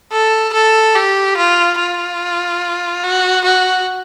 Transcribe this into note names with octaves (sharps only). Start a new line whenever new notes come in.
A4
A4
G4
F4
F4
F#4
F#4